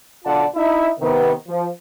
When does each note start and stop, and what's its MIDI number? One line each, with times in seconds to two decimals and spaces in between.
0.25 0.44 35
0.25 0.44 50
0.25 0.44 65
0.25 0.44 74
0.25 0.44 78
0.25 0.44 81
0.55 0.89 63
0.55 0.89 64
0.55 0.89 76
1.00 1.31 48
1.00 1.31 51
1.00 1.31 59
1.48 1.67 53